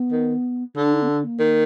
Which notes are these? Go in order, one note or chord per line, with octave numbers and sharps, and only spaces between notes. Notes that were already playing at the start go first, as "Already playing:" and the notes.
Already playing: B3
D#3
D3 D4
D#4
B3
D4
A#3
D#3